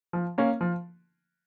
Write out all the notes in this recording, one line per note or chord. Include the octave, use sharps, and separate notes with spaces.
F3
A#3 C#4
F3